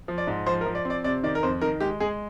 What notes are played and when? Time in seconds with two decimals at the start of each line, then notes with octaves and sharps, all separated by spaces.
0.08 F3
0.18 D5
0.27 G#2
0.47 F3 C5
0.61 A#4
0.66 F3
0.75 D5
0.85 C4
0.90 D5
1.04 C3 D5
1.23 D#3 D5
1.35 A#4
1.43 F2 C5
1.61 D#3 A#4
1.80 G#3 G4
2.00 G#3 G#4